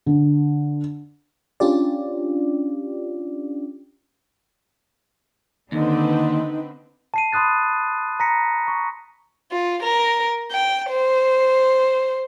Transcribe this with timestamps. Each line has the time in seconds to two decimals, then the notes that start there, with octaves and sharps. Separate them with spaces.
0.06 D3
1.60 C#4 D4 F4 G4 D5
5.72 D#2 D3 C4 D#4 B4
7.14 A5 C7 D#7
7.33 B5 C6 D#6 F#6 A6
8.20 A#5 A#6 B6 C#7
8.68 C#6
9.52 F4
9.83 A#4
10.51 G5
10.90 C5